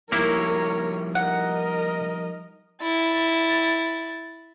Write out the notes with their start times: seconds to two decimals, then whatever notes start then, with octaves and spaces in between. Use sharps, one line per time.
0.12 F3 G3 A#3 D#4 E4 A#4 C#5
1.15 A#4 D#5 F#5
2.82 E4 A6